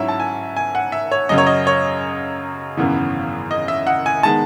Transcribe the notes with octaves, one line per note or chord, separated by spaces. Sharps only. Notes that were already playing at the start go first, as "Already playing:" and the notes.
Already playing: G#2 F#3 C#4 E4 E5
A5
G#5
G#5
F#5
E5
C#5
F#2 C#3 F#3 D#5
C#5
D#5
C#5
G#1 F#2 C#3 E3 B3
D#5
E5
F#5
G#5
D#3 G#3 B3 A5